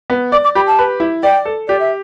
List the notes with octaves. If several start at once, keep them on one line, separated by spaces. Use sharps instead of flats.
B3
D5 D6
D6
G4 B5
A5
B4
E4
D5 G5
A4
G4 D5
E5